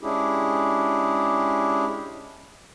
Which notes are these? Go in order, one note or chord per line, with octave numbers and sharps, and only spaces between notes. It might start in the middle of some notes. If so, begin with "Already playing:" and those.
G#3 C#4 D4 E4 G4 G#4